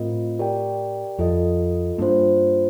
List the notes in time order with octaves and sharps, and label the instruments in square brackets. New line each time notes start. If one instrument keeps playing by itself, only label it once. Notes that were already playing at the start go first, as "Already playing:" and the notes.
Already playing: [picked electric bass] A2 [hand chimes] C4 F4 A#4 D#5
[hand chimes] G4 A#4 D5 G5
[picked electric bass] F2 [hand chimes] F4 A4 D#5
[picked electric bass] G2 [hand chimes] A#3 D4 F4 C5